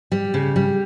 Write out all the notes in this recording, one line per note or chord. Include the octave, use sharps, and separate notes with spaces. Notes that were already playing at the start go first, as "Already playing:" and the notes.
G3
C#3
G3